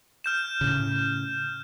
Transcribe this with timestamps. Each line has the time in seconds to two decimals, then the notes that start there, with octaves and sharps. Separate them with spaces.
0.24 F6 G6 E7
0.61 A2 C#3